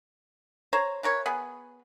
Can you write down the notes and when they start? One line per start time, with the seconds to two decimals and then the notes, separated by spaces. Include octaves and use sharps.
0.73 C5 C#5 A#5
1.03 E3 A#4 C#5
1.26 B3 G#4